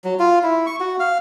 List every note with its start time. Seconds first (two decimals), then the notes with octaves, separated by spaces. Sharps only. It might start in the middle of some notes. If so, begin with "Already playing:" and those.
0.04 F#3
0.19 F4
0.43 E4
0.66 C#6
0.80 F#4
1.00 F5